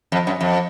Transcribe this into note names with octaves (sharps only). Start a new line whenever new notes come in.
F2
F#2
F2